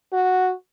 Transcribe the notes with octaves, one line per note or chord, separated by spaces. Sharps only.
F#4